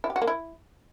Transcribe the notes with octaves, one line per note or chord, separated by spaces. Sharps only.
E4
G4
F#4
A#3
E4